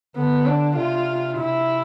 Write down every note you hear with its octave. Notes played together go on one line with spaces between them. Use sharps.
D3 B3
D4
C3 F4
C3 E4